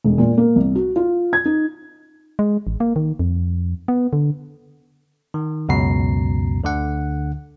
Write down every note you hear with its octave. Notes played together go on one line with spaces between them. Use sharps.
E1
A#2
A#3
C2
F#4
F4
G#6
D#4
G#3
A1
A#3
D#3
F2
B3
D3
D#3
C#2 F#2 B2 A#5 C7
D2 D3 F#5